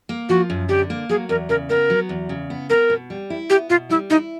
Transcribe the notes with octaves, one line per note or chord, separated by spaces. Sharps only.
A#3
F3 F#4
F#2
D3 G4
A#3
F#3 G#4
E2 A#4
C#3 A#4
B3 A#4
F#3
E2
C#3
B3
B3 A#4
B2
G3
E4
B3 G4
B2 F4
G3 E4
D#4 E4